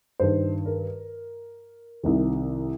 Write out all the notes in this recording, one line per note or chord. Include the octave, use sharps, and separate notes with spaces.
G2 D#3 C5
A#4
C2 C3 D#3